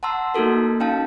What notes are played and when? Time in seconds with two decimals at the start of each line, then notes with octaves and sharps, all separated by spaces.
0.03 F#5 A5 A#5 C6 E6
0.34 A#3 D#4 F#4 A4 A#4
0.80 C#4 D#4 F5 G5 A5